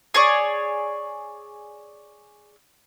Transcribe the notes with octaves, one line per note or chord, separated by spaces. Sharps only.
G#4 C#5 D5